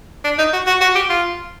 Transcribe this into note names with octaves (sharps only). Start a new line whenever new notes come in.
D4
D#4
F#4
F#4
F#4
G4
F4